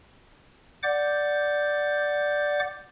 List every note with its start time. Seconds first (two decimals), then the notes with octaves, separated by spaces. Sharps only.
0.83 D5 F#5 D6 G6